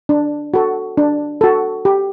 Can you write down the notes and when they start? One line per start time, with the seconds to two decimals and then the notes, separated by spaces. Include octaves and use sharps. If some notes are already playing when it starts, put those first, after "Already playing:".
0.09 D4
0.54 F#4 A4
0.97 D4
1.41 F#4 A4
1.85 G4